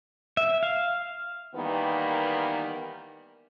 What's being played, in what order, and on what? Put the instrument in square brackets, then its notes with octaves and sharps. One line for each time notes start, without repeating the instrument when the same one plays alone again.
[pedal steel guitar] E5
F5
[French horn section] D#3 E3 G3 A#3 B3